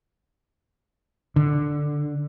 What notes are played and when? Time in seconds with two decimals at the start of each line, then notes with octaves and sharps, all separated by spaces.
1.36 D3